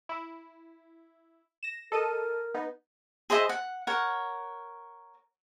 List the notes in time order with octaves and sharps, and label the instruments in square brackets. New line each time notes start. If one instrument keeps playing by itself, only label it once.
[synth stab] E4
A#6 E7
[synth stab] A4 D#5 D#7 [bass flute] A#4
[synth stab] B3 D#4
[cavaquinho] G#4 C5 D#5 E5
F#5
A#4 C#5 F#5